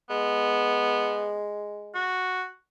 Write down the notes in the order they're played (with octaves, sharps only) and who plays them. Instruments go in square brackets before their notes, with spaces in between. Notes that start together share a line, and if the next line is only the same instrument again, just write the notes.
[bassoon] G#3 [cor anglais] B3
[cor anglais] F#4